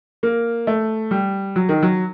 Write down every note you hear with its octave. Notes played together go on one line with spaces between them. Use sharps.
A#3
A3
G3
F#3
D#3
F#3